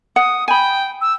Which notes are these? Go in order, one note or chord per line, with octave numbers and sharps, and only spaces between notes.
F#5 D#6
G5 G#5 B5
E6